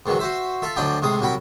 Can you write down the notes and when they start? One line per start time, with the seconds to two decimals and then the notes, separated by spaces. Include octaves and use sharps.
0.06 G#2 D#3 E3 F#3
0.19 F#4 C5 E5
0.62 F4 A4 E5
0.76 D2 F3 F#3 D4 D#5 G5
1.02 A2 C3 G#3 D#6
1.21 C2 F#3 F#4 G5 B5